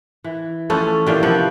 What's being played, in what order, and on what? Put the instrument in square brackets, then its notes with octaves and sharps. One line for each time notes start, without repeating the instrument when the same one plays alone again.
[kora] E3
[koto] E3 F3 A3 [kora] C#4
[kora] A#2 D#3 E3 [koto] D4 F4 G4
[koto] C3 [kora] F3 B3